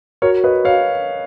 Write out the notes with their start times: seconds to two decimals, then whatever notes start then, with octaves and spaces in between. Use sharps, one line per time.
0.22 F#4 A#4 C#5
0.44 B4 D#5
0.65 C#5 F5